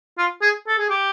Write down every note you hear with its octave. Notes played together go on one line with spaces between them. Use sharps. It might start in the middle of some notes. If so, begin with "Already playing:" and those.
F4
G#4
A4
G#4
G4